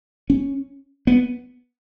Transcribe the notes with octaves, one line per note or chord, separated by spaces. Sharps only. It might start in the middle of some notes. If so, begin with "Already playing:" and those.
C#4
B3